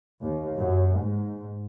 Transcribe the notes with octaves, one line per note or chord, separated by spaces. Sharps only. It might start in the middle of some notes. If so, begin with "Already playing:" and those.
D#2
F#2
G#2